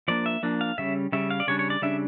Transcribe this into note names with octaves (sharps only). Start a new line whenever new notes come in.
F3 A#3 D4 D5
E5
F3 A#3 D4
F5
C#3 G3 C#4 E5
C#3 G3 C#4 E5
F5
D5
C#3 G3 D4 C#5
C#5
D5
C#3 G3 D4 E5